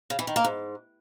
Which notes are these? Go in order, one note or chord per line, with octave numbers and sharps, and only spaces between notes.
C#3
E3
D#3
A#3
G#2